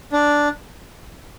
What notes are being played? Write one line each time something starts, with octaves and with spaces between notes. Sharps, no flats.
D4